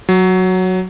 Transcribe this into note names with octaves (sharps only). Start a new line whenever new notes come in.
F#3